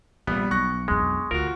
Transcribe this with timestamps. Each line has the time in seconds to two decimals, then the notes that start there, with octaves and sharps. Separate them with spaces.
0.27 A#1 C3 G3 B3
0.51 B1 C#6 F#6 A#6
0.88 F2 G#3 D4
1.31 D2 F4 F#4 A#4